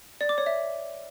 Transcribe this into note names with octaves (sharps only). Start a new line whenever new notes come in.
D5
D6
C#5
E5